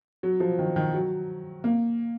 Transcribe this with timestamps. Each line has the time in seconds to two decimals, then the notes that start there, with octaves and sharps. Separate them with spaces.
0.23 F#3
0.40 F3
0.59 D#3
0.76 D#3
0.94 F#3
1.64 A#3